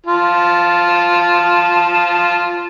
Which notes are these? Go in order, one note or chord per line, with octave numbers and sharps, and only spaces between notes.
F4 A5